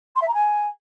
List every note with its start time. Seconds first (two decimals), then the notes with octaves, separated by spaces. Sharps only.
0.15 C6
0.21 E5
0.27 A#5
0.34 G#5